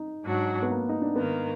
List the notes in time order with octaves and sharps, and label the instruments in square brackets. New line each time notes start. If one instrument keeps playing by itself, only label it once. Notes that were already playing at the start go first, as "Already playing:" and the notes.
Already playing: [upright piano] D#4
[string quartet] G#2 F#3 D4 F#4
[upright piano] B3
A#3
D#4
D4
[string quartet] G#2 D#3 A#3 [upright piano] B3